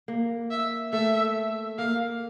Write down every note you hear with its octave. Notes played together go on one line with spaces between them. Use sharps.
A#3
E5
A3 E5
A#3 F5